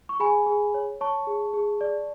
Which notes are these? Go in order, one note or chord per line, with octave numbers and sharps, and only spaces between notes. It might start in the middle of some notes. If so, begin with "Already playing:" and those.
C#6
G#4 G#5 B5
G#4
C#5
C#5 A5 C#6
G#4
G#4
D5